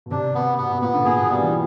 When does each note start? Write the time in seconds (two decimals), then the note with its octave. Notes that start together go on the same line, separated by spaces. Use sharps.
0.06 B2
0.11 C3 D4
0.35 B3
0.58 B2 B3
0.70 B2
0.82 A#2 B3
0.94 D3
1.05 A#2 G#4
1.18 B2
1.29 B2 G3
1.41 E3